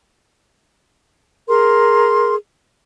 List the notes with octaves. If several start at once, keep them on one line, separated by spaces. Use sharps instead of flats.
G#4 A#4 C6